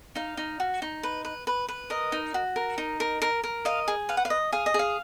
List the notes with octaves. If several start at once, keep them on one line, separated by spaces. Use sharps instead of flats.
D#4 F5
D#4
F#4
D#4
B4
B4
B4
B4
A#4 D#5
D#4
F#4
A#4
D#4
A#4
A#4
A#4
D#5 F5
G#4
B4 F5
F#5
F5
D#5
G#4 F5
D#5
G#4
F5